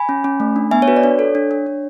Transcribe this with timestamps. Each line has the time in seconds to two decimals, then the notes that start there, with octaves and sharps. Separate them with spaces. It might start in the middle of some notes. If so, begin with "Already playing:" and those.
Already playing: G#5 B5
0.09 C#4
0.24 C#4
0.40 A3
0.56 D4
0.71 B3 E5 G#5
0.82 C#5
0.88 F#4 B4
0.96 D5
1.03 D4 C#5
1.19 A4
1.35 D4
1.51 D4
1.66 D4